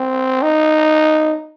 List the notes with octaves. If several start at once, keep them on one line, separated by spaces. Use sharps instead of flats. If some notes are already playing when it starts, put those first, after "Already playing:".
Already playing: C4
D#4